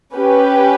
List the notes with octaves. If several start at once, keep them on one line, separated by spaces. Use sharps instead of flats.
C#4 G4 B4